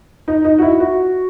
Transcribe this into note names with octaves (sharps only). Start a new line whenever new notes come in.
D#4
D#4
F#4
E4
F#4